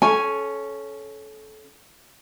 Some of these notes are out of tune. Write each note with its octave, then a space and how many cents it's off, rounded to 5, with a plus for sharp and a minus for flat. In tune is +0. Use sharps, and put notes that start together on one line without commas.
C#4 +0 A4 -25 G#5 +0